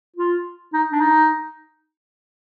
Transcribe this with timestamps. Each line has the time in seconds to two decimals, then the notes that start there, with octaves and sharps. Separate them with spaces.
0.16 F4
0.74 D#4
0.92 D4
1.01 D#4